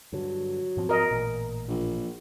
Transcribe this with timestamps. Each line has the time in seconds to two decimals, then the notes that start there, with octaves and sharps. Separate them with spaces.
0.13 G2 D3 F#3
0.77 G#2 F3 C4
0.89 A#4 D#5
1.11 A1 A#2
1.68 A#1